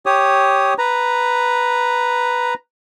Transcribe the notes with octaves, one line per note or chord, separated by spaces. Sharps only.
G4 C#5 D#6
B4 A#5